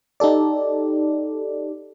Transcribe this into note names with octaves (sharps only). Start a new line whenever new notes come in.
D#4 G4 A4 D5